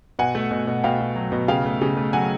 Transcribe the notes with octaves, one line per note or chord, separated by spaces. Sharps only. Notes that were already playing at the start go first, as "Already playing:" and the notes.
B2 F#5 G#5
A3
B2
B2
B2 F5 G5
B2
F#3
B2
C#3 F5 G5
A3
C#3
A3
F#3 F#5 G#5